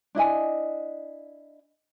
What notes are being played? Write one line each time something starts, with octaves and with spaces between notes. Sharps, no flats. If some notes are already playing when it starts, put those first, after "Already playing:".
D4 E4 D#5 G#5